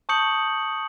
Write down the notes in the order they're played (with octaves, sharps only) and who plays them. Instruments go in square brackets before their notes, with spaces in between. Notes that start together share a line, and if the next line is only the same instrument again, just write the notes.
[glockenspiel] A5 C#6 D#6 G6 C#7 F#7